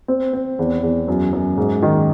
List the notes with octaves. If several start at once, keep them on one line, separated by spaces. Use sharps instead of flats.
C4
C4
E2
E2
F#2
F#2
G#2
D#3